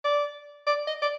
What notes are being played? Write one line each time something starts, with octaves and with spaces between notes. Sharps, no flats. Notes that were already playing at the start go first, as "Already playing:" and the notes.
D5
D5
D#5
D5